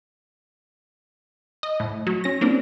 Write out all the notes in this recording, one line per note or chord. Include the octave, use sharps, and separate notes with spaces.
D#5
A2
F#3
C#4 A#6
A#3 C4 D4